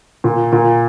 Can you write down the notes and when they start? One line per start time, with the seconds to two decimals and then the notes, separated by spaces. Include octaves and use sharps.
0.24 A#2
0.52 A#2